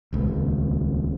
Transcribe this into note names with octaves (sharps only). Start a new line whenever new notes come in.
D#1 C#2